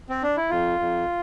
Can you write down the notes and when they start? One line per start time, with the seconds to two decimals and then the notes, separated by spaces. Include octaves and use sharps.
0.09 C4
0.23 D4
0.37 E4
0.50 F2 F4
0.79 F2